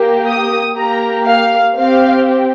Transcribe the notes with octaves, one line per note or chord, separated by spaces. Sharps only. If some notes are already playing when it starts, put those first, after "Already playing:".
Already playing: A#3 G4
D#6
A#3 G4 A#5
F5
C4 G4 F5